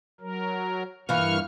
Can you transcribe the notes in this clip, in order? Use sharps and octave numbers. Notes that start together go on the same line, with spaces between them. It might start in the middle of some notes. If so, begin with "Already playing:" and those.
F#3 A#4
G2 E3 A#3 C#6 F6